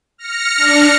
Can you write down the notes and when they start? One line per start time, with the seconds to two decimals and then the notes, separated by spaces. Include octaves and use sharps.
0.18 F6 A#6 C#7
0.57 D4